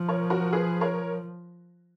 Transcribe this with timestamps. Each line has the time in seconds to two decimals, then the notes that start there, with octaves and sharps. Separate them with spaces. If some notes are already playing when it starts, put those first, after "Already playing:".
Already playing: F3
0.09 A#4 C#5
0.30 F#4 A#4
0.53 G#4 B4
0.81 A#4 C#5